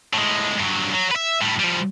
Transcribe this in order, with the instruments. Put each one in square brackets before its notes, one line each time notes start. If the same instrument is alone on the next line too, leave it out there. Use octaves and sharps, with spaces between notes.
[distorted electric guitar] A2 G#3
G2 F#3
F#3
B4 E5
A2 G3
F3 G3